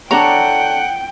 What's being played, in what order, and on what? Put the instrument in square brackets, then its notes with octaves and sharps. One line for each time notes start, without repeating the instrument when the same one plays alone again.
[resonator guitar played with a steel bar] D4 A4 C#5 [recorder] F#5 [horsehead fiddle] G5 [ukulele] A#5